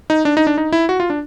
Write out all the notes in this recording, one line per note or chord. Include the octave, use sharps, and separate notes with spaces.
D#4
D4
D#4
D4
D#4
E4
F#4
F4
D4